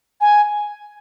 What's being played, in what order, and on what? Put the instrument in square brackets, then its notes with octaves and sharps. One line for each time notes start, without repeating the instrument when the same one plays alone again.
[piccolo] G#5